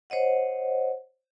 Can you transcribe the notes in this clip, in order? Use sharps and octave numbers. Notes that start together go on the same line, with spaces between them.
C5 C#5 D#5 F#5